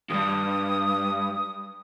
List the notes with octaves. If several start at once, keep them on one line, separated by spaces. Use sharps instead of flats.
E2 G2 D#6